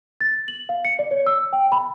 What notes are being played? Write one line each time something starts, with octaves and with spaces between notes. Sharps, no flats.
A6
F#7
F5
C#7
D5
C#5
E6
G5
B5